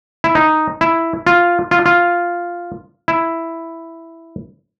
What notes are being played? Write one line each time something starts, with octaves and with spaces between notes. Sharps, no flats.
E4
D#4
E4
F4
F4
F4
E4